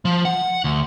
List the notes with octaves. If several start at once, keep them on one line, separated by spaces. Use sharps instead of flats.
F3
F#5
D2